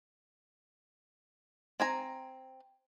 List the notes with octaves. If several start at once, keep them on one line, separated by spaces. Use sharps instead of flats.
C4 G#5 A#5